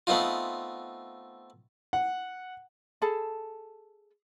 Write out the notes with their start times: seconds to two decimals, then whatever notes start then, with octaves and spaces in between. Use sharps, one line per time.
0.07 A3 B3 C4 D#4 F4
1.93 F#5
3.02 G#4 A4 A5 B5